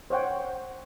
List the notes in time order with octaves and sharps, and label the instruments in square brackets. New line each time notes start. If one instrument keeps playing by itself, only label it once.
[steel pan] C5 C#5 F#5 G5